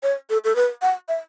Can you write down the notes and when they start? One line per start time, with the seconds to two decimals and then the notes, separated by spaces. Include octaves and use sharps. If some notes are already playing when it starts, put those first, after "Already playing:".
0.03 C#5
0.30 A4
0.44 A4
0.56 B4
0.82 F#5
1.08 E5